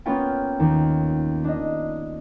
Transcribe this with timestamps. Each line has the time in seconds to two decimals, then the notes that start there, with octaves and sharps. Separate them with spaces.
0.06 A#3 B3 C#4 F4 G5
0.60 D#2
1.44 D4 D#5